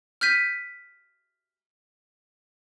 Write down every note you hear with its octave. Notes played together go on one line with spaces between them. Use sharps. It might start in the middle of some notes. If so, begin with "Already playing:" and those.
F6 G6 B6 D#7